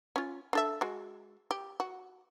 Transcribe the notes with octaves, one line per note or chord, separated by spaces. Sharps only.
C#4 F4
D4 A4 E5
G#3 F#4
G4
F#4